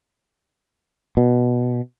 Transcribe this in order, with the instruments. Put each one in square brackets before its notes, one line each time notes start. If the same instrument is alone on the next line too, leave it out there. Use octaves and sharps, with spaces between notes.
[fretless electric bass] B2